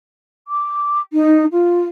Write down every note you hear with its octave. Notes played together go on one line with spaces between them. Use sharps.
D6
D#4
F4